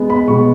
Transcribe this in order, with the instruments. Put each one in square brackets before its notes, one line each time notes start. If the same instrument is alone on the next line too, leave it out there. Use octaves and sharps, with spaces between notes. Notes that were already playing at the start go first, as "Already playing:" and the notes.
Already playing: [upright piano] G#3 B3
B5
B2 G#3 B3 C#6